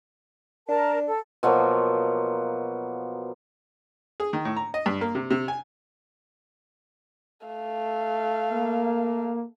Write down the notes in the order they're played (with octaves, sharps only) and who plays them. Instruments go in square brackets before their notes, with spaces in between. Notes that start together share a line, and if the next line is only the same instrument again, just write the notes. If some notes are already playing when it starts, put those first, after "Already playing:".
[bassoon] D4 [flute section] A#4 A5
[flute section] A4
[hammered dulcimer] B2 F3 F#3 A#3
[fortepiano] G#4
D#3
A2
A#5
D#5
G2
A#3
C3
C3
G#5
[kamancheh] A3 F5
[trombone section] A#3